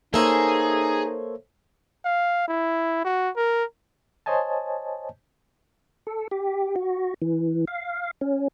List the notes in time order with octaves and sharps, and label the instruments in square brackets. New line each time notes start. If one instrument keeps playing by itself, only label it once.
[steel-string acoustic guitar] A#3 E5 [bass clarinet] D#4 [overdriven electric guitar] G#4 [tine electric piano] A4 C5 C#5
[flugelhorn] F5
E4
F#4
A#4
[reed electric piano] C5 C#5 D#5 G#5 A5
[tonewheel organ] A4
G4
F#4
E3
F5
C#4